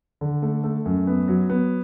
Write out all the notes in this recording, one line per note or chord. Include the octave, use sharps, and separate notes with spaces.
D3
A3
A3
F#2
B3
F#3
B3